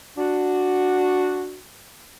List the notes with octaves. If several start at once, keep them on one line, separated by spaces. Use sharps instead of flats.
D4 F#4